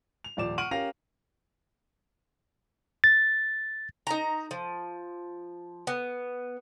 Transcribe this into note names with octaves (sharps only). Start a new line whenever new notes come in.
F7
D#1 F3 D5 D6 E7
F#5 C#6 F6 D7 D#7 F#7
C#4 G4 A#4 F5 A#6 F7
A6
D#4 A#5
F3
B3